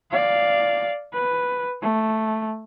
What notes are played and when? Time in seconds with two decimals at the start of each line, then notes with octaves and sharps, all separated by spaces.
0.11 D5 F5
1.13 B4
1.82 A3